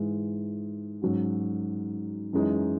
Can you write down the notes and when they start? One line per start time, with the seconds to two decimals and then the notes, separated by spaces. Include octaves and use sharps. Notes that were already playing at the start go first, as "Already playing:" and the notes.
Already playing: G#2 E3 G#3
1.02 G#2 F#3 C#4 F#4
2.33 F#2 E3 G#3 D#4